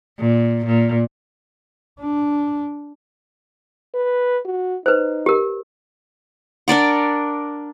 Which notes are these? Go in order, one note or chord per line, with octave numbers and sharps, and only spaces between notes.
A#2
A#2
D4
B4
F#4
D#4 B4 C5
G4 A#4
D4 A#4 D5 F#5